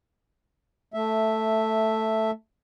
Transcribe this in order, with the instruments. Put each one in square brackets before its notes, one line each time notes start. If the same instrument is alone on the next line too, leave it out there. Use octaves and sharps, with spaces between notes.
[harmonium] A3 E5